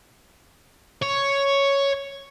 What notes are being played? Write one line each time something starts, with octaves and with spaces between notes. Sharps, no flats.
C#5